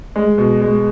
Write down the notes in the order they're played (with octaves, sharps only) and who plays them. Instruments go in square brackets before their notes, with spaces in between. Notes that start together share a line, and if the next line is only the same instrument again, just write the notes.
[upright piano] G#3
B2
G#3